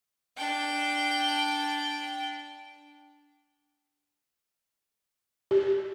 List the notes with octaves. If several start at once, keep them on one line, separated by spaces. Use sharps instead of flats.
D4 G5
G4